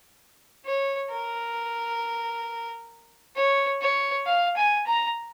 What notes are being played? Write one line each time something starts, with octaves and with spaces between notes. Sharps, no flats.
C#5
A#4
C#5
C#5
F5
G#5
A#5